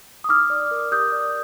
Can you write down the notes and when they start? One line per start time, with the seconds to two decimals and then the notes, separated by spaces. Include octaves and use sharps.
0.24 D#6
0.29 D#4 D6 F6
0.50 D5
0.71 A#4
0.92 G4 D#6 G6
1.12 D5